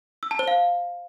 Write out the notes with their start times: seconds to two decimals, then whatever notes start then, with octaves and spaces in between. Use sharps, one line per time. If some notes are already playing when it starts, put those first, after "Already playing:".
0.23 E6
0.31 A5
0.39 C5
0.48 F5